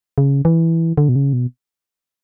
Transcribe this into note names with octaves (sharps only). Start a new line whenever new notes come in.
C#3
E3
D3
B2
C#3
B2